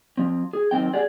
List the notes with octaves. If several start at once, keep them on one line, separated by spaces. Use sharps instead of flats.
F3 C4
G#4
F#2 D#3 E3 C4 G5
G4 G#4 D5 F#5